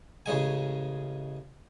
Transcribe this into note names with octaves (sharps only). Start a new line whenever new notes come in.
A1 C#3 G#3 G#5